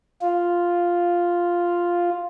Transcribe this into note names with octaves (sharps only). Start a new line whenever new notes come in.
F4